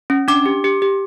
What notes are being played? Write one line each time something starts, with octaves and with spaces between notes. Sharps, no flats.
C#4
D4 D6
G4
G4
G4